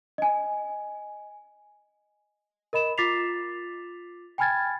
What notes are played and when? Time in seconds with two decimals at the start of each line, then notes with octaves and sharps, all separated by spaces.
0.18 D#5 G#5
2.73 A#4 D#5 B5 E7
2.98 F4 D6 A6 B6 C7 F7
4.38 G5 G#5 B5 F6 G#6 A6